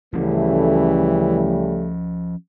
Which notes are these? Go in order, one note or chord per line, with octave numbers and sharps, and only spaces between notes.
C#3 E3 F3 G3 A3 C#4